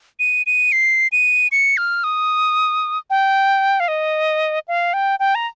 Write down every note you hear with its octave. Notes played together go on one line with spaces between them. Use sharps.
D#7
D#7
C7
D#7
C#7
F6
D#6
G5
F5
D#5
F5
G5
G5
A#5